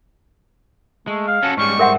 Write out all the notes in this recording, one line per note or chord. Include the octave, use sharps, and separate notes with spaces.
G#3 A3
F5
C#4 F#4 A4
G#2 G3 G#3 C#4 C#6
A#4 C5 E5 F#5